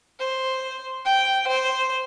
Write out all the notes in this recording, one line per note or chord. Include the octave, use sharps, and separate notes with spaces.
C5
G5
C5